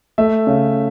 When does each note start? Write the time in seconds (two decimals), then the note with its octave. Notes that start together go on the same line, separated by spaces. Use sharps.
0.18 A3 E5
0.47 C#3